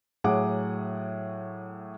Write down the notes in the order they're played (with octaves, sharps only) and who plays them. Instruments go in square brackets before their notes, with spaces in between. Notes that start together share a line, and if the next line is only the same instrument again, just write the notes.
[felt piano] A2 F#3 G#4 F#5 D6